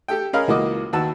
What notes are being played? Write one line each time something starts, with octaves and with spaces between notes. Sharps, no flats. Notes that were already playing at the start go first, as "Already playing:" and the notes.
G4 A4 G5
C#4 G#4 A#4 D#5 F5 B5
C#2 E3 A#3 F#4 D#5 D6
D#2 F#4 B4 A5 E6